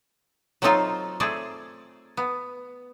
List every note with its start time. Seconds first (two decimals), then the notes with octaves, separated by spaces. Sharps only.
0.62 F#3 A3 C4 D#4 F4
1.20 A3 C4 G#4 D5
2.17 B3